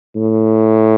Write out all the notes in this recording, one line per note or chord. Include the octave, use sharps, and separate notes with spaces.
A2